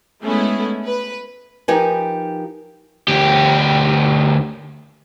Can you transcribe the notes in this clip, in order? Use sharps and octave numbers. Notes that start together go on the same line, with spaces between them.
G#3 A3 B3 C#4 E4 G#4
B4
F3 D#4 G4 A#4 B4 G#5
D2 G4